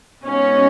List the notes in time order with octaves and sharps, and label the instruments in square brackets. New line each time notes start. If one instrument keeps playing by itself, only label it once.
[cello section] B2 G#3 B3 D#4 F#4 [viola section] C#4